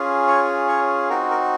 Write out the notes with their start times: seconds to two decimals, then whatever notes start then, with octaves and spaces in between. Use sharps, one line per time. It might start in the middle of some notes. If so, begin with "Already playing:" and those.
Already playing: C#4 F4 G#4
0.28 C#5
0.68 C#5
1.10 C4 D#4 F#4 A#4
1.30 A#4